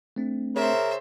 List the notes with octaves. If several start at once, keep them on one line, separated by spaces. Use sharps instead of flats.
A3 C4 D4
C#3 A#4 C5 E5